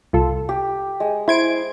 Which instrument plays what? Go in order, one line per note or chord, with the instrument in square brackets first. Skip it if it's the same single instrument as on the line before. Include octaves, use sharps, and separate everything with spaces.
[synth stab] C2 F4 A4
[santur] G4
G#3
[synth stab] E4 G#6 D7 [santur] C5